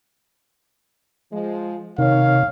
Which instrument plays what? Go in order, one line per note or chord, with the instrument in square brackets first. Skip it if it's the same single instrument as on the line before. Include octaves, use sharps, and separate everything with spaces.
[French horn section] F3 G#3
[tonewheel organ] C3 [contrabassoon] D#3 [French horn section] C#5 [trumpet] F5